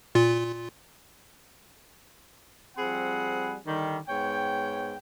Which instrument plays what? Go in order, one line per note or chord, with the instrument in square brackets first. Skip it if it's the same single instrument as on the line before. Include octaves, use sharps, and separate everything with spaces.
[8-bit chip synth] A#2 F4
[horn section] F3 G3 C4 G#4 F#5 B5
D3 D#3 G3
G#2 B3 C#5 G5